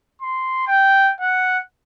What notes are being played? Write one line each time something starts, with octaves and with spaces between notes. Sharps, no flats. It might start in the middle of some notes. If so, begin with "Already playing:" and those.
C6
G5
F#5